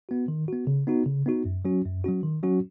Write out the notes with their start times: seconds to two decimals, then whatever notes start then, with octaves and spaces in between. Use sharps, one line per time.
0.09 B3 F#4
0.28 D#3
0.48 B3 F#4
0.67 C#3
0.87 B3 D#4 F#4
1.06 C#3
1.26 B3 D#4 F#4
1.45 F#2
1.65 F#3 C#4 F#4
1.85 F#2
2.04 F#3 C#4 F#4
2.23 D#3
2.43 F#3 C#4 F#4